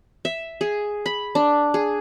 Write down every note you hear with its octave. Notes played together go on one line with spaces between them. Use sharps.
E5
G#4
B5
D4
G#4